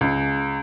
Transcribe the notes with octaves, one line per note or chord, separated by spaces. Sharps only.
C#2